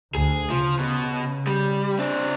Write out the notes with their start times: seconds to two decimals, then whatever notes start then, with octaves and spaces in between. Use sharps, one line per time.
0.15 D2 G#4
0.50 C#3 F3
0.79 B2
1.47 G3
1.98 C4 D4